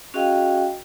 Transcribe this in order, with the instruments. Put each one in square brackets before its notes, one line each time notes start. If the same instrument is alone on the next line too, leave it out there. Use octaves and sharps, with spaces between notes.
[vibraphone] C#4 F#4 G#4 D#5 F5 G5